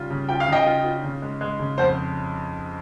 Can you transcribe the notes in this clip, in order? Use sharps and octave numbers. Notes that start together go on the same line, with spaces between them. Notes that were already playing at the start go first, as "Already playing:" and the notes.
Already playing: C#3 G3 F4
C#3
F4 G5
F5
C#3 D#5 G5
F4
F4
C#3
G#3
G#3
C#3
F2 C5